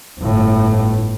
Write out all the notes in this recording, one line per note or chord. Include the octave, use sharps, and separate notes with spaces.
G1 A2